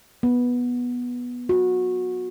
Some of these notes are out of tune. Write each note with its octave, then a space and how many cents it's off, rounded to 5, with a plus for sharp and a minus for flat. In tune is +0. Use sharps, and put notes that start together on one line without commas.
B3 -10
F#4 -20